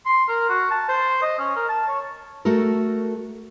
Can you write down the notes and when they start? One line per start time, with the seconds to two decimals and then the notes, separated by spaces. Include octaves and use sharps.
0.05 C6
0.28 A#4
0.49 F#4
0.71 A5
0.88 C5
1.22 D#5
1.39 C#4
1.56 A#4
1.69 A5
1.88 C#5
2.45 A3 F#4 A4 A#4